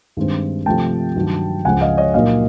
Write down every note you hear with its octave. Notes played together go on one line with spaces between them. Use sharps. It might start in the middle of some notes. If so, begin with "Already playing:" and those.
G2 D#3 G#3 C4
C3 F3 A3 G5 A5
G2 D#3 F#3
C#2 C#3 F3 G#3 F#5 G#5
D#5 F5
C#5 D#5
A#2 F#3 A#3 D#4 D#5 F5